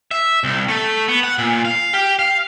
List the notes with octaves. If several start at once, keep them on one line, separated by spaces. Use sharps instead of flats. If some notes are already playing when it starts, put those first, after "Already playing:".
E5
C2
A3
B3
F#5
A#2
F5
G4
F5